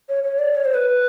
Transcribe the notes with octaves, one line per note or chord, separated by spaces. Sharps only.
C#5
C#5
D5
C#5
C5
B4